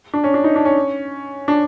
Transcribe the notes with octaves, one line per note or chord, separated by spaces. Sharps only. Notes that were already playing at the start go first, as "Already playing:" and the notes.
D4
C#4
D4
D#4
D4
C#4
D4